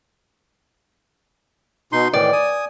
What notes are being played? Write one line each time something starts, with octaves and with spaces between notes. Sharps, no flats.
B2 D#4 C6
A2 D#3 E3 D5
G#5 D#6